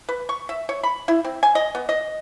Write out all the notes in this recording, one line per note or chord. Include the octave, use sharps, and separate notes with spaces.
B4
C#6
E5
C#5
B5
E4
C4
G#5
D#5
B3
D#5